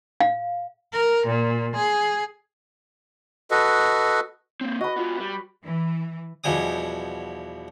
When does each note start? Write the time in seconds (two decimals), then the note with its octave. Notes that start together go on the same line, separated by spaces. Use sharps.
0.20 F5
0.93 A#4
1.27 A#2
1.76 G#4
3.51 F#4 A4 B4 D#5
4.61 A#3 C4
4.81 F#4 B4 D#5
4.96 B3 F4
5.19 G3
5.63 E3
6.44 E2 B2 F3 G3 G#5 D#6